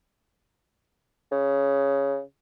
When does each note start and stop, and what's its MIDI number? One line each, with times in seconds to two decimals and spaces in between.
1.32 2.20 49